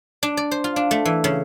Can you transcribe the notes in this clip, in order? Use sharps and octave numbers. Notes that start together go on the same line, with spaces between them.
D4
D5
C5
F4
D4
A3
E3
C#3